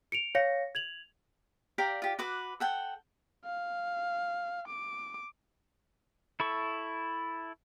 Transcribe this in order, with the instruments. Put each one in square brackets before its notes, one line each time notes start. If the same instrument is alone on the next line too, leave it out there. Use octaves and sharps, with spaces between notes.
[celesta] C#7 D7 F7
C#5 F5 A#6 C#7
G#6 F7 F#7
[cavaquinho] G4 D5 F5 A#5
F4 G4
F#4 B4 D6
A4 F#5 G5
[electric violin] F5
D6
[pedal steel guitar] E4 A4 C#6